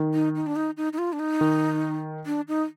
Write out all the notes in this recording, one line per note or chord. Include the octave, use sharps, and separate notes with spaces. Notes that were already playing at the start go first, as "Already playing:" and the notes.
Already playing: D#3
D#4
D#4
D4
D#4
D#4
D#4
F4
D4
D#4
D#3
D4
D#4